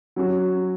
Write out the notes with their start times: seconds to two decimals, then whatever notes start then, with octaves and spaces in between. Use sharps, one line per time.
0.16 F#3 C#4 F#4